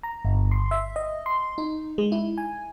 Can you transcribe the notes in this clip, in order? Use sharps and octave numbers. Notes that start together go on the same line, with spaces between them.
A#5
G1
C6
E5
D#5
C6
D#4
G#3
E4
G#5